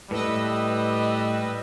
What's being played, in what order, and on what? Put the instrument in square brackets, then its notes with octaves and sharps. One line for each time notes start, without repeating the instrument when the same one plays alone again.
[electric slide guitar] A2 [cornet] G3 [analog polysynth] B4 D#5 E6